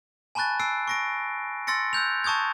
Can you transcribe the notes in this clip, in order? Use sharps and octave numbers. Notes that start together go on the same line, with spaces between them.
G#5 A5 B5 C#6 F#6 A6
E6 F#6 C7 D7
C#6 A#6 D7
C6 E6 A6 A#6 C#7
E6 F#6 G6 F7
A5 C#6 D#6 G6 G#6